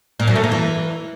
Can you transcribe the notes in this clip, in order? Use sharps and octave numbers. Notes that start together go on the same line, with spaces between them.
A#2
F#2
A3
A#3
E3